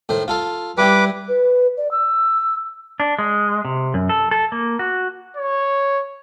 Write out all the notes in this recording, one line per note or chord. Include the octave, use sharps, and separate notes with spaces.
A2 D#3 C5
F4 A4 F5
G3 E4 G4 B4 D6
B4
D5
E6
D4
G#3
C3
F#2
A4
A4
A#3
F#4
C#5